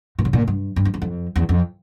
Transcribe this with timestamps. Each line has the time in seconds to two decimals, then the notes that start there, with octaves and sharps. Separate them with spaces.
0.19 A#2
0.25 C#3
0.33 A#2
0.48 G2
0.76 G2
0.85 F2
0.94 E2
1.02 F2
1.36 E2
1.49 F2